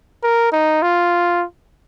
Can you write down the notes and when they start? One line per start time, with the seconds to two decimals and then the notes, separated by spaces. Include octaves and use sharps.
0.23 A#4
0.52 D#4
0.82 F4